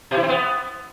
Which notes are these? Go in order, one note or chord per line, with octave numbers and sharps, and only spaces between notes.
B2
E4
C4
B3